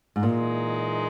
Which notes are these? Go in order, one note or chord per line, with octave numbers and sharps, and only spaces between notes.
G#2
A#2 E3 G#3 D#4